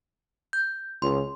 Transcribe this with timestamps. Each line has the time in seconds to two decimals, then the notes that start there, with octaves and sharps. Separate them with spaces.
0.53 G6
1.02 C#2 C6